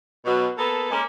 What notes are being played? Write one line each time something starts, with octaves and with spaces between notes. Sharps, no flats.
B2 F#3
A#3 B3 A4
G#3 A#3 C#4